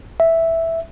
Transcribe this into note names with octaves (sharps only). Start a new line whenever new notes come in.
E5